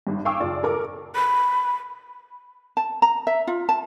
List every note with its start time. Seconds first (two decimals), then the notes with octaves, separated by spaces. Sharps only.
0.07 G#1 G2
0.25 F5 G5 G#5 C#6 D6 E6
0.40 F#1 F4 D5
0.63 A4 A#4 D6
1.16 B5
2.77 A5
3.02 A#5
3.27 E5
3.47 F4
3.69 A5